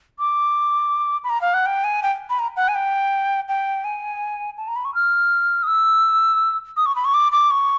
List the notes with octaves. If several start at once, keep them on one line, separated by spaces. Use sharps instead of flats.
D6
B5
A#5
F5
F#5
G5
G#5
G5
B5
A#5
F#5
G#5
G5
G5
G#5
A5
A#5
B5
C#6
F6
D#6
E6
D#6
C#6
B5
C#6
D6
D6
C#6